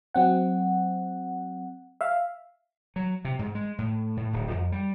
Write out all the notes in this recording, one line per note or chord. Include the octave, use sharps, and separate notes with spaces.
F#3 C4 F#5
E5 F5
F#3
C3
G#2
G#3
A2
A2
D1
F2
G3